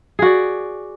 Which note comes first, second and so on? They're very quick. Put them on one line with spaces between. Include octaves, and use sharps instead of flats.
G#4 F#4 D5